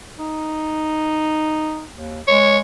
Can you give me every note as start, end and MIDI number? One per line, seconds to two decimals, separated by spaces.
0.19 1.85 63
1.93 2.20 39
2.28 2.61 56
2.28 2.58 73